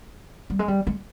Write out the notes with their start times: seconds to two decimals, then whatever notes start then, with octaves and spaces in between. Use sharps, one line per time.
0.50 G3
0.59 G#3
0.68 G3
0.87 G#3